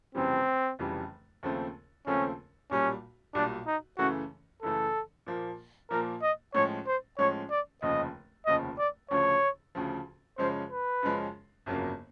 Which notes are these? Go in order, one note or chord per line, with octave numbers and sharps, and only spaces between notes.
F1 F2 C#3 E3 G3 C4
F1 F2 C#3 E3 G3
D#2 C#3 F3 A3 C4
D#2 C#3 F3 A3 C4 C#4
B1 A#2 G3 C#4
B1 A#2 G3 D4
D#4
F#2 C#3 E3 A3 F#4
F#2 C#3 E3 A3 A4
A#2 F3 A#3
A#2 F3 A#3 A#4
D#5
A2 F3 G#3 C#4 C#5
C5
A2 F3 G#3 C#4 C#5
D5
F1 D#2 C#3 F3 D#5
F1 D#2 C#3 F3 D#5
D5
D2 C#3 F3 C#5
D2 C#3 F3
F#2 C#3 F3 G#3 C#4 C5
B4
F#2 C#3 F3 G#3 C#4
G1 F2 C#3 F#3 A#3